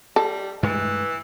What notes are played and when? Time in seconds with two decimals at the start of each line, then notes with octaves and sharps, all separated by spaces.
0.16 G3 A4
0.63 G2 E3 G#3 A3